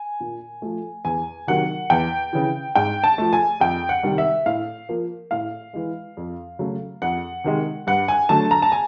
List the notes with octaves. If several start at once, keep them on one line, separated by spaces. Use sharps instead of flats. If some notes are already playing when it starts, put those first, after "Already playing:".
Already playing: G#5
A#2
F3 A3
E2 G#5
C3 D#3 F#3 A#3 F#5
E2 G5
C#3 E3
G#2 G5
A5
F3 A3
G#5
F2 G5
F#5
C3 D#3 G3
E5
A2 F5
F3 A#3
A2 F5
E3 G#3
F2
C#3 F#3 A3
F2 F#5
C3 D#3 G#3
G2 F#5
G#5
D3 F#3 A3 A5
A#5
A5
G#5